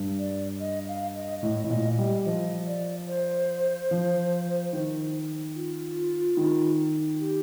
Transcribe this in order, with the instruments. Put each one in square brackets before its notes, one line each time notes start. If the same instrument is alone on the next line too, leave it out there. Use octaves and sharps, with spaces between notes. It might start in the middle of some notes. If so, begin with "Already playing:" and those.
Already playing: [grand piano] G2
[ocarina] D5
D#5
F5
D#5
[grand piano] A2 [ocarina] D#5
[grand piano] A2
[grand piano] A#2 [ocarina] D#5
[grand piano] G3 [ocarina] D#5
[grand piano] F3 [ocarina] D#5
[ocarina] D5
C5
[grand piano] F3
D#3
[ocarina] F4
[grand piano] D#3
[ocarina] G4